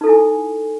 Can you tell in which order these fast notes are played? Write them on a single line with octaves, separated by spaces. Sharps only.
D#4 A4 E4 G#5